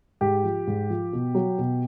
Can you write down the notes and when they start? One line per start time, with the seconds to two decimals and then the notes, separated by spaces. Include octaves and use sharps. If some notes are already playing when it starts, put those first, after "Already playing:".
0.21 G#2 G4
0.44 F3
0.67 G#2
0.90 F3
1.13 B2
1.35 F#3
1.58 B2